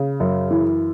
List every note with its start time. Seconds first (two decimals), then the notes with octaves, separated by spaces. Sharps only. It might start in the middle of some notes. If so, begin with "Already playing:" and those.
Already playing: C#3
0.20 F#2
0.51 E3